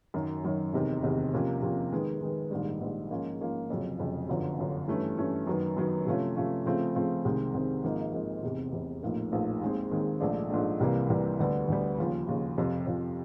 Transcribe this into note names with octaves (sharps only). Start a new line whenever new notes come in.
F#2 D#3 F#3
F#2 D#3 F#3
F1 E2 C3 D#3
F1 E2 C3 D#3
C3 F3 A#3 C#4
C3 F3 A#3 C#4
D#3 G#3 B3
D#3 G#3 B3
A#1 G#2 D#3 G3
A#1 G#2 D#3 G3
G#2 F3 A#3 C#4 F4
G#2 F3 A#3 C#4 F4
F1 F2 C#3 F#3
F1 F2 C#3 F#3
G1 F#2 D3 F3
G1 F#2 D3 F3
G2 E3 A3 C#4
G2 E3 A3 C#4
F#2 D#3 F#3 B3
F#2 D#3 F#3 B3
C3 F3 A3 C#4 F4
C3 F3 A3 C#4 F4
C#3 F3 A3 C4 F4
C#3 F3 A3 C4 F4
C2 C3 D#3 G#3 C4
C2 C3 D#3 G#3 C4
G#1 G#2 F3 A#3 D#4
G#1 G#2 F3 A#3 D#4
F1 E2 C3
F1 E2 C3
A#1 A2 F3 A#3 D#4
A#1 A2 F3 A#3 D#4
D#2 D#3 G#3 C4
D#2 D#3 G#3 C4
A#1 G#2 F3 A3 D4
A#1 G#2 F3 A3 D4
C2 C3 E3 G3 A#3
C2 C3 E3 G3 A#3
D2 D3 G3 B3
D2 D3 G3 B3
D#2 C#3 F3
D#2 C#3 F3
F2 C3 F3
F2 C3 F3